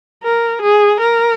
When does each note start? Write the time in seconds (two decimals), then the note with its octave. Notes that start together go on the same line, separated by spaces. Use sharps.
0.24 A#4
0.62 G#4
1.01 A#4